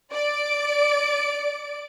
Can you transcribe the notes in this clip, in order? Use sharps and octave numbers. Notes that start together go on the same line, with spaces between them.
D5 D7